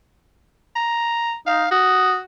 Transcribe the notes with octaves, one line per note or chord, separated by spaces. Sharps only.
A#5
D#4 F5
F#4 D#6